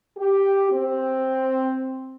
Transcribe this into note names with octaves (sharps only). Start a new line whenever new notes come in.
G4
C4